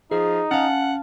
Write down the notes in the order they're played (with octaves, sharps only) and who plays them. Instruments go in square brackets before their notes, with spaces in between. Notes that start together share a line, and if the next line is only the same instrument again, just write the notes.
[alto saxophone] F3 [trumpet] D#4 [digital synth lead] G#4
[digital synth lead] C#4 [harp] F5 A5 [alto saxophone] F#5